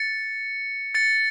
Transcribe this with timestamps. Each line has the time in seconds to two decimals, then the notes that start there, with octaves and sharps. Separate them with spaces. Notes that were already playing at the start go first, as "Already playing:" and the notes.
Already playing: A6 C#7
0.95 A6 C#7